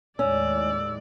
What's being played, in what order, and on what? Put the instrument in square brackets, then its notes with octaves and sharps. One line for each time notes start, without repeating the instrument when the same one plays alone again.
[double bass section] D#2 A2 G#3 [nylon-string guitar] C#4 [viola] D5 [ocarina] E6